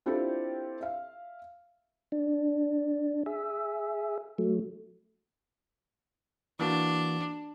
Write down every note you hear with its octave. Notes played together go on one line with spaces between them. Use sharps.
C4 D4 E4 F4 G4 A4
E5 F5
D4
G#4 E5
F#3 A3
E3 A#3 D4 F#4